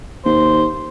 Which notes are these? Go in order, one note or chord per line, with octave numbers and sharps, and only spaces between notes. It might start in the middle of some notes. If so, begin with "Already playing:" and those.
D#2 C5